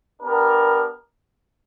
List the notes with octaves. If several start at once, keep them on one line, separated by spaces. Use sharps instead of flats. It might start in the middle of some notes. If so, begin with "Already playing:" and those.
B3 D4 G4 A#4